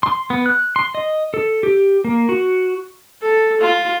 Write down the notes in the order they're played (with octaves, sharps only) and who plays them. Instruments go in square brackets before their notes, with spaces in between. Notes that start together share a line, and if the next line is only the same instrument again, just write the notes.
[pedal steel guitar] C6
B3
F#6
C6
D#5
A4
G4
A#3
F#4
[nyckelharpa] A4
F4